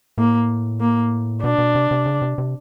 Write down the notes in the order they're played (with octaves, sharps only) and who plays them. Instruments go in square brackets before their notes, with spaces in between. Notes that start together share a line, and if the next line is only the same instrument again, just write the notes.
[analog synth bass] A2 [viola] A#3
[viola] A#3
[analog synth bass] B2 [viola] D4
[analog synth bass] B2
C3
C3
C#3
C3
C3